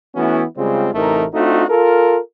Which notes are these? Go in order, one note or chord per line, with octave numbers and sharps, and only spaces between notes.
E3 A3 B3 C#4 E4 F#4
C#3 G3 G#3 C4 F4
A1 C3 E3 A3 D#4 A#4
A3 C4 D4 D#4 F4 F#4
F4 A4 A#4